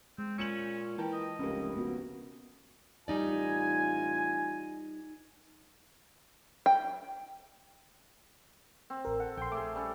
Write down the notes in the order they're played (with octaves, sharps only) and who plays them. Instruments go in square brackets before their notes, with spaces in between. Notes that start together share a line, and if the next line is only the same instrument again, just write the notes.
[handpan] G#3 [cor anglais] C4
[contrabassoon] A#2 [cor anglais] C#4 [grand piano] C#7 E7 F#7
[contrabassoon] E3 [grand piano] A#4 G5 A5
[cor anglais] D#5
[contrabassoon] F1 [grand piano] C#2 A#3 [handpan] C#4 G4
[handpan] B3 F#4
[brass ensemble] A1 F4 G#5 [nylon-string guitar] G3 D#4 D5
[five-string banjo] G5
[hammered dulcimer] C4
[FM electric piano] A1 A#4
[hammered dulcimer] A4 [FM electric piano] F#5
[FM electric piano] A#1 C6 [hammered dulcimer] G5
[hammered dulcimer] A3 G#4 [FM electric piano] D6
[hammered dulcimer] G3 C#4 A4